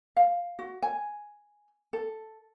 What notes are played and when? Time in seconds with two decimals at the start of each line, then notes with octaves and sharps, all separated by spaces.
0.16 F5
0.59 F#4
0.82 G#5
1.93 A4